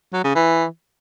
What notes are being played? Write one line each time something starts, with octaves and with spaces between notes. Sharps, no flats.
F#3
C#3
E3